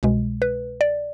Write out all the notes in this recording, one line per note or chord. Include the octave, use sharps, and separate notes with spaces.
C2 B2 G#3
B4
D5